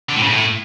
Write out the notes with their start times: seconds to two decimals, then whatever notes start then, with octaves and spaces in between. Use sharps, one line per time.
0.09 D3
0.16 A2
0.23 C#3
0.29 A2